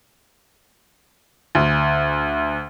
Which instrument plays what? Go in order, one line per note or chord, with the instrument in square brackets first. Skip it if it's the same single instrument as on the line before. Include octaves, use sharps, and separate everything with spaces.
[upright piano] D2